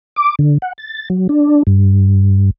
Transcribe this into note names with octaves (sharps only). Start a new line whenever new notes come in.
D6
D3
F#5
A6
F#3
D4
G2